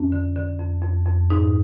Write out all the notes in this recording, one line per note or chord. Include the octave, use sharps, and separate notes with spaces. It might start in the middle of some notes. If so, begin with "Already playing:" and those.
Already playing: F2 C#4
D3
D3
F2
F2
F2
G#2 D#4